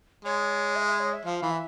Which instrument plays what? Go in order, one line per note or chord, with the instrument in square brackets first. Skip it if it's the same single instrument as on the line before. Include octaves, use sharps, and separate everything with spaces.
[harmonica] G#3 [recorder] C#5
[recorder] E5
E5
C#5
E5
[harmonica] F3 [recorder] F5
[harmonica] E3
[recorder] E5